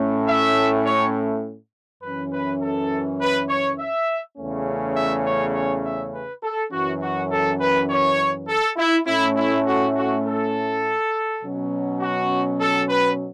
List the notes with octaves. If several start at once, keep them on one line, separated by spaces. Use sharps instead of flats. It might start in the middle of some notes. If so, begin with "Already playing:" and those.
Already playing: A2 A3 C#4
E5
C#5
F#2 E3 C#4 B4
B4
A4
B4
C#5
E5
E2 C#3 A3 C#4
E5
C#5
C#5
E5
B4
A4
F#2 E3 C#4 F#4
F#4
A4
B4
C#5
A4
E4
A2 A3 C#4 E4
E4
F#4
F#4
A4
B2 F#3 C#4
F#4
A4
B4